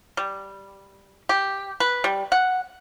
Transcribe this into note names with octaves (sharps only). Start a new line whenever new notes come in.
G3
G4
B4
G3
F#5